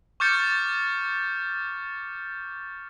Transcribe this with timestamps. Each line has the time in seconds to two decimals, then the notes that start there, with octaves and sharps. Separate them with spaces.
0.20 C#6 D6 F6 G6 A6 C#7